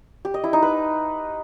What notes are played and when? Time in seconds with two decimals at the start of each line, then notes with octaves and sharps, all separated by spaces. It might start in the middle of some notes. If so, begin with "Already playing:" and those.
0.25 G4
0.34 D#5
0.44 E4
0.53 D#4
0.62 B4